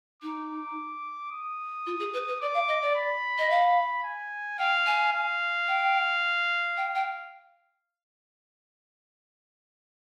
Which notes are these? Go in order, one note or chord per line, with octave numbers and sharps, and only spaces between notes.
D#4 D6
D#6
F4
G#4
B4
B4
D5 D6
F5
D#5
D5
B5
D#5
F5
G#5
F5 G5
G#5
F5
G5
G5
G5